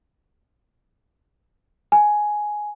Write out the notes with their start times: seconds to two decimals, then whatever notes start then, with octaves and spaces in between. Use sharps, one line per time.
1.92 G#5